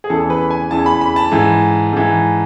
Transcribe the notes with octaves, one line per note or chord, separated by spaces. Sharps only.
G#4
E2 C#3 E3 A4
B4
G#5
E2 C#3 E3 A5
B5
B5
A5
G#2 E3
G#2 E3